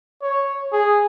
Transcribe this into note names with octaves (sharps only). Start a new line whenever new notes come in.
C#5
G#4